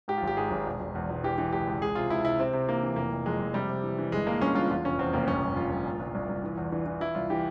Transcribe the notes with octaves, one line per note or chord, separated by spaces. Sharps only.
G#2 G4
F4
G#1 G4
G#2 G#4
G#1
E1
E1
E2
E1
E3 G4
E3
C#2 G4
C#2
C#2 G#4
C3 F4
C#2 E4
C3 E4
C3 C4
C3
E3 A#3
E3
F1 A#3
F1
F2 G#3
F2
C3 G3
C3
E3
E3
G1 G#3
G2 A#3
G1 C#4
G2 F4
E2 F4
F1 C#4
E2 C4
F1 A#3
G1 C#4
G1
G1 F4
G1
A#2
C2
C2
C2
E3
E2
E3
E3
E3 E4
C2 F4
E3 G4